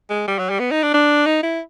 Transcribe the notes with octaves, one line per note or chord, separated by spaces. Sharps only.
G#3
G3
F#3
G3
B3
D#4
D4
D4
D#4
E4